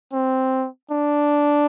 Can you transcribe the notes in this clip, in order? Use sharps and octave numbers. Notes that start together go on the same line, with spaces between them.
C4
D4